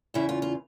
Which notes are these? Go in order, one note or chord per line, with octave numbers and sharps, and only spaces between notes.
E2 C#3 E3 E4
F4
F4